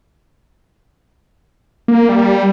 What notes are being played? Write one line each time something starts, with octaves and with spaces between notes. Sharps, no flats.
A#3
G3